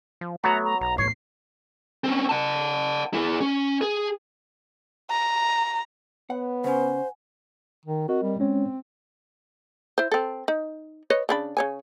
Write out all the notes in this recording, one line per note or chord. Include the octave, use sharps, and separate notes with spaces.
F3
F#3 A3 B3 F#4 A#5
A#5
B1 A#5
E2 A2 C#5 C7
C4 C#4
F#5 A5
E4 G#4
C#4
G#4
A#5
B3 C#5 F#5
C#3 C#4 C5 F#5 G#5
D#3
C4 F#4 A#4 D#5
G3
G#3 C4 C#4 C#5
E4 C5
C4 A4
D#4
B4 C#5 D#5
C#3 D4 B5
C#3 C#5 G#5